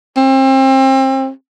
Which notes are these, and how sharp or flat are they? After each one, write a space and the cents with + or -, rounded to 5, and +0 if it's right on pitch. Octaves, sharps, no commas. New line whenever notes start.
C4 +30